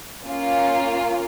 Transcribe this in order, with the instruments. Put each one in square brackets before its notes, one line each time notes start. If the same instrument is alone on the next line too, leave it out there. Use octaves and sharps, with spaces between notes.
[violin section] A#3 C#4 F4